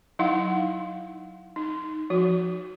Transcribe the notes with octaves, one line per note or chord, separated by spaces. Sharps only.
F#3 D#4 E4 F5 F#5
D#4
F3 F#4